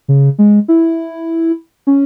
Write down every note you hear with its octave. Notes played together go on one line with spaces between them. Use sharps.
C#3
G#3
E4
C#4